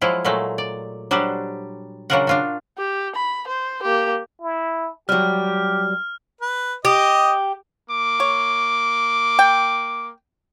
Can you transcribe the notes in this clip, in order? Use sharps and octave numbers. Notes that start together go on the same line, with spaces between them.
F3 F#3 G#3 E4 F4
A#2 F#3 G#3 A3
D5
F#3 G3 D4 F#4 G4 C5
C#3 F#3 D4 F4 A#4 F#5
D4 F4 F#4
G4
B5
C5
A#3 G4
E4
F#3 G3 G4 F6
B4
G4 D#5
A#3 D6
C#5
G5